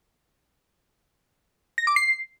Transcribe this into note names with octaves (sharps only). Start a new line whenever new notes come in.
A#6
D6
C7